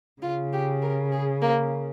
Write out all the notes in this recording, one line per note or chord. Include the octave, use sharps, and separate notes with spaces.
C#3 F4
G4
A#4
G#4
A#3